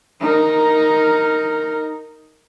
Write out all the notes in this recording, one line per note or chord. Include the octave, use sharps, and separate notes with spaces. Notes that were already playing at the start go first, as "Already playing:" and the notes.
D#4 A#4